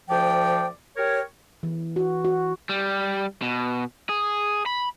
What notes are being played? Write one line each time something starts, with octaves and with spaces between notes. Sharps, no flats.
D2 F3 D5 G5
G4 A#4 C#5
E3
F#4
F#4
G3
B2
G#4
B5